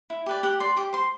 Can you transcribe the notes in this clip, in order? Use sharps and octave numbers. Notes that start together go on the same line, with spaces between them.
E4
G4 B4 D5
G4 F#5
D5 C6
G4 D6
C5 C6